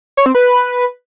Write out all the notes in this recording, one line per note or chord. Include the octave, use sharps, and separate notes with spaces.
C#5
C4
B4